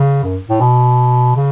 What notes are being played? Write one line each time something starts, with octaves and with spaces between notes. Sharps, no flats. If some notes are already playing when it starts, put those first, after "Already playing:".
Already playing: C#3
F#2
A2
B2
C#3